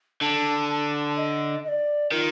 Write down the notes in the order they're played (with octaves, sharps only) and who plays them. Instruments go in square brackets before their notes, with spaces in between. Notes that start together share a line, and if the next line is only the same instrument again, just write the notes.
[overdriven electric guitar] D3 [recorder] A5
[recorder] A5
D#5
D#5
D5
[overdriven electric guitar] D#3 [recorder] F4